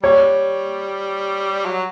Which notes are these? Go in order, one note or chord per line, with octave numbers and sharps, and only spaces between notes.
G3 C#5
F#3